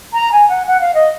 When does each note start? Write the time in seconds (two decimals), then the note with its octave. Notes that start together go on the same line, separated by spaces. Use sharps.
0.13 A#5
0.32 G#5
0.48 F#5
0.66 F#5
0.80 F5
0.94 D#5